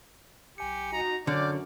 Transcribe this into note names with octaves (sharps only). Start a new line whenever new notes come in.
B1 G4 G#5 C#7
D#4 F#4 A#5
F#2 D3 C#5 D5 D6 F6 G6